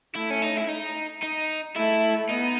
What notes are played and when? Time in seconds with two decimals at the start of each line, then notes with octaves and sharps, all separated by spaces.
0.15 A3 E4
0.30 C#4
0.42 D#4
0.57 E4
0.69 D#4
1.22 D#4
1.76 A3 E4
2.29 B3 D#4